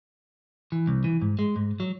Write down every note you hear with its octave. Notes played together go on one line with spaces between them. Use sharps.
E3
C2
E3
G#2
G#3
G#2
F#3